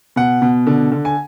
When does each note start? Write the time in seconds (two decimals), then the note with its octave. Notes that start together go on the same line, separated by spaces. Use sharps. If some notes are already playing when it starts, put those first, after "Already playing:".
0.16 B2 F#5
0.42 B2
0.67 D3
0.92 D3
1.05 G#5